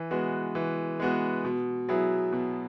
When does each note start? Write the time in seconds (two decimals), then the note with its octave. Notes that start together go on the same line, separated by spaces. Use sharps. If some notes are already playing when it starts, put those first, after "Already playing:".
Already playing: E3
0.11 G#3 B3 F#4
0.55 E3
1.00 G#3 B3 F#4
1.44 B2
1.89 F#3 B3 E4 G#4
2.32 B2